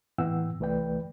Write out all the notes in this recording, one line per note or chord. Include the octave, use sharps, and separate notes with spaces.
A2 E3 B3 F#5 G5 E6
C2 E3 A3 B4 D5 G5